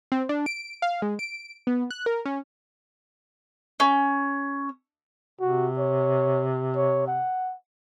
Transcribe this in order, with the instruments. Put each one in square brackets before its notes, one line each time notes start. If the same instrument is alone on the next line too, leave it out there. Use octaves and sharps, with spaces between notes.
[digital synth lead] C4
D4
D7
F5
G#3
D7
B3
F#6
A#4
C#4
[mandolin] C#4
[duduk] C3 [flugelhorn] F#4
[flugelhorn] C#5
C#5
F#5